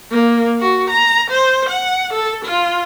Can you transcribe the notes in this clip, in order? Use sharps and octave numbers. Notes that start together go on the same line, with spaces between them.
A#3
F#4
A#5
C5
F#5
A4
F4